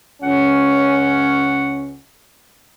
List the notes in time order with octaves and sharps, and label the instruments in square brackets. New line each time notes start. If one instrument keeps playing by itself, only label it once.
[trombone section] C#2 C#4 [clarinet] F#5